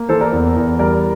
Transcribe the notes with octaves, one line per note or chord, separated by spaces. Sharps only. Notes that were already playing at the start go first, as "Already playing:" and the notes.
Already playing: A#3
E3 A4 C5
A#4 D5
E2
E2
G3 A#4 D5